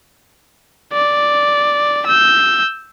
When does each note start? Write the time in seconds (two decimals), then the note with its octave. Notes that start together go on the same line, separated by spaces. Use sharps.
0.93 D5
2.07 E6 G6